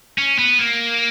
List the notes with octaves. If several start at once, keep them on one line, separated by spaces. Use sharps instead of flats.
C#4
B3
A#3